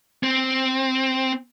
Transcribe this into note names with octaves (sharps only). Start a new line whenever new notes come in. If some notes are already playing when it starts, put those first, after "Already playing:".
C4